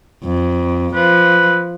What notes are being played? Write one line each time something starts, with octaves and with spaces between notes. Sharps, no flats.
F2
F3 B4